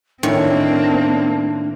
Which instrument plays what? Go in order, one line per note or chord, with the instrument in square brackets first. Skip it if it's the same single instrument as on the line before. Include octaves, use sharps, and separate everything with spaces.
[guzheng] A2 D#3 C#5 [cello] A#3 C4 [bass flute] D4